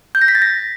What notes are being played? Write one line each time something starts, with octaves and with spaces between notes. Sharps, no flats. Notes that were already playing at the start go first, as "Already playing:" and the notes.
G6
A#6
B6
A6
A#6